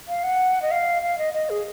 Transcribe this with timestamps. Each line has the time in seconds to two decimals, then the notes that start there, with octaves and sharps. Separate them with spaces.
0.08 F5
0.24 F#5
0.62 D#5
0.71 F5
1.02 F5
1.18 D#5
1.34 D#5
1.50 G#4